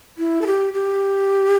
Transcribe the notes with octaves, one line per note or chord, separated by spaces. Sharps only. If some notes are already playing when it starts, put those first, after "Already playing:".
E4
A4
G4
G4